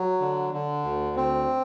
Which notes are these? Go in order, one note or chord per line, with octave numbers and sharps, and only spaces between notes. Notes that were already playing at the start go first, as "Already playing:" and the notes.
Already playing: F#3
D3
D3
D2
C4